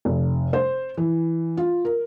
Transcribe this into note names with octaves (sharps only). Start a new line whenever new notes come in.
F1
C5
E3
F4
A#4